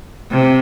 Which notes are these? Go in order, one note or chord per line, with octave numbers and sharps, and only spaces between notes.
C3